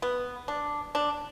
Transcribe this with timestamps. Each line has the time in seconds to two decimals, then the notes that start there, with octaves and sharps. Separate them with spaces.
0.02 B3
0.48 D4
0.95 D4